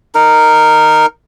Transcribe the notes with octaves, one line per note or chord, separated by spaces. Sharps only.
D#4 A#4